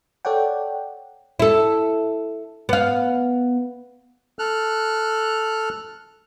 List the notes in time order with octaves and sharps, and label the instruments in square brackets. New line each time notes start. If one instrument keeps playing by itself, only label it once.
[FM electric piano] A4 C#5 D5 F#5 G5
[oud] E4 A4
B3 F5
[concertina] A4 F6 F#6